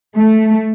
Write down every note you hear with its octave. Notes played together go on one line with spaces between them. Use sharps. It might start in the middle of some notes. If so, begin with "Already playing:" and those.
A3